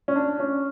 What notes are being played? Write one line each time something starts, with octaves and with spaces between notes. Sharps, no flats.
C#4
D4
C#4